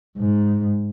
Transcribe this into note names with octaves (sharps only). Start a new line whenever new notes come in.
G#2